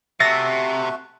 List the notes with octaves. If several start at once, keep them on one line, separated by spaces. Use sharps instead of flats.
C3 A3 F#4 E5 A6 A#6